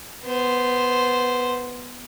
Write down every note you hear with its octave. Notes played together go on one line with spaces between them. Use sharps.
B3 C5